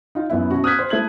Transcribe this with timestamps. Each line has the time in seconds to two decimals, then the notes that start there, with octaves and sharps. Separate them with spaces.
0.15 D#4 F4
0.30 F#2 B3 E4
0.50 B2 C#4 F#4
0.64 D#6 F6 F#6 G#6 B6
0.79 C5
0.90 A3 E4 G#6 F#7